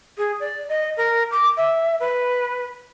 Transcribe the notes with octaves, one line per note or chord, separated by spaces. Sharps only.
G#4
D5
D#5
A#4
D6
E5
B4